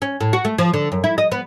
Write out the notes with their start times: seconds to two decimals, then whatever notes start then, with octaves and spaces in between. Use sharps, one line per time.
0.02 C#4
0.20 A2
0.33 F#4
0.45 A3
0.59 F3
0.74 D3
0.92 F#2
1.04 E4
1.18 D#5
1.32 B3